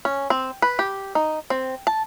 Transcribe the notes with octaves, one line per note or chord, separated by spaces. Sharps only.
C#4
C4
B4
G4
D#4
C4
A5